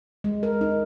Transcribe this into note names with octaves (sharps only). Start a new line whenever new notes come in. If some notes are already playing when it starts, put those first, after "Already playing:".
G#3
A#4
D#4